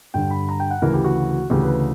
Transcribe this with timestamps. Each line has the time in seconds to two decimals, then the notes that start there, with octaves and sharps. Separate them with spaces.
0.14 G2 D3 G5
0.30 B5
0.49 A#5
0.60 G5
0.71 F#5
0.82 D2 C#3 E3 A#4
0.94 G4
1.04 F#4
1.50 D2 C#3 E3 G4
1.63 B4
1.73 B4